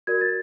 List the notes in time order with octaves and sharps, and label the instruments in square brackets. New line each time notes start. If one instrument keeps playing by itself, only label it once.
[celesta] F#4 A#4 D5 G#6
A6